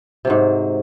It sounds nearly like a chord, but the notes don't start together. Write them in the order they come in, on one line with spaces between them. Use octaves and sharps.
C3 F#3 G#2